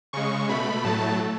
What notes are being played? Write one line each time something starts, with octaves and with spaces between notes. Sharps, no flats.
C#3 G#3 C#6
B2 A3 B5
A2 F#3 A3 A5